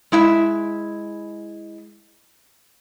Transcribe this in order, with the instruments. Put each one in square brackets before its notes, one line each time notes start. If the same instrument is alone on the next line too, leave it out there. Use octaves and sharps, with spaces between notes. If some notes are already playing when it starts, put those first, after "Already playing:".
[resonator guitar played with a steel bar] G#3 E4 E5